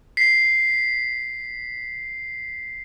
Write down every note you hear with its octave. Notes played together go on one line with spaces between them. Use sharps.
B6 C7